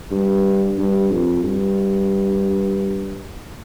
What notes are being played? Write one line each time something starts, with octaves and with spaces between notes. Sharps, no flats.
G2
G2
F2
G2